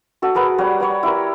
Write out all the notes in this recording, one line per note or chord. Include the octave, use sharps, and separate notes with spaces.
F#4 A4 F#5
G#4 A#4 B4 F#5
G3 C#5 F#5
C#5 D5 F#5
E4 G4 A#4